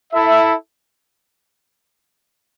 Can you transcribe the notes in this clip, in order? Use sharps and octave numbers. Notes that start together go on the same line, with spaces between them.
E4 A4 E5